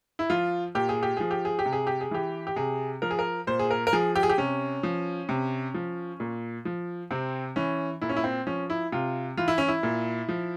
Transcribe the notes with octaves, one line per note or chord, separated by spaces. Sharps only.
E4
F3 F4
A#2 G4
G#4
G4
F3 G#4
G4
G#4
G4
C3
G#4
G4
G#4
E3 G4
G4
C3 G#4
F3 A#4
G#4
A#4
A#2 C5
G#4
A#4
A#4
F3 G#4
G4
G#4
G4
C3 C#4
F3
C3
F3
A#2
F3
C3 C4
E3 C#4
A#2 E4
C#4
E4
C4
F3 C#4
E4
C3 F4
E3 F4
E4
C#4
E4
A#2
F3